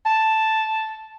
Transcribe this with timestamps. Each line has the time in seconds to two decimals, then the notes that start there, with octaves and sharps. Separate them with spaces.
0.06 A5